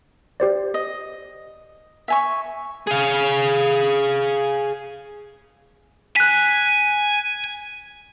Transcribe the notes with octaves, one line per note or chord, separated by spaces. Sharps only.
G4 C5 D5
D#5
E5 G#5 C#6
G#4 F5
G#5 F#6 B6